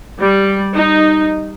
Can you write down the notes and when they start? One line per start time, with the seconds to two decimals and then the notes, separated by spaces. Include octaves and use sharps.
0.20 G3
0.75 D#4